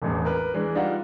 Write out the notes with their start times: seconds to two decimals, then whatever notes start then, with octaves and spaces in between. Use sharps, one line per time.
0.02 E1 A1 E2
0.25 A#4 B4
0.54 E3 G#3 D4
0.75 G3 D4 D#4 F4 F5 F#5